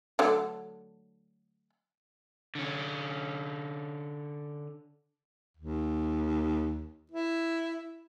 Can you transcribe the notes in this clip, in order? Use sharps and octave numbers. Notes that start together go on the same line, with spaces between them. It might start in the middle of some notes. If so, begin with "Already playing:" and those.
D3 F#3 A3
D3 C#4
D#2
E4